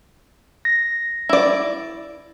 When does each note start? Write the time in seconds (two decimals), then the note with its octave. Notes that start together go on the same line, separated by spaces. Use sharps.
0.65 A#6
1.29 E4 D5